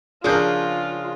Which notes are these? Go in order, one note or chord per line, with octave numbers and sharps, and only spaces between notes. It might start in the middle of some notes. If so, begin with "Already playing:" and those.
C#3 F3 D4 F4 G#4 A#4 G6